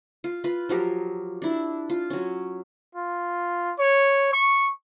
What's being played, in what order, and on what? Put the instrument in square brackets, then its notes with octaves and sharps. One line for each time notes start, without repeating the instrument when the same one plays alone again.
[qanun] F4
F4 B4
F3 F#3 G4 A#4
D4 E4
F4
F#3 C#4
[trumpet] F4
C#5
C#6